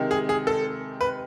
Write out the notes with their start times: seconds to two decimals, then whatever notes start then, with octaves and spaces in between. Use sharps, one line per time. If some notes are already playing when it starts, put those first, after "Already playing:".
Already playing: C3 D#3 G#3
0.11 G#4
0.29 G#4
0.47 A4
1.01 B4